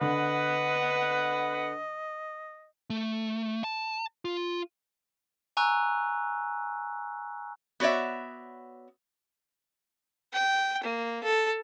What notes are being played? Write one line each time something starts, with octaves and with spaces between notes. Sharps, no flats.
D3 B4 D#5 F#5
A3
A5
F4
G#5 A#5 C#6 E6 F#6
B3 F#4 C#5 D5 E5
G5
A#3
A4